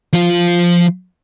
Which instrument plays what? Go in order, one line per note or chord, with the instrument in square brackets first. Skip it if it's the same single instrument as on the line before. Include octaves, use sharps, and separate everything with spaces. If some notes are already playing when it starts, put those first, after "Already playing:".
[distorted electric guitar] F3 F4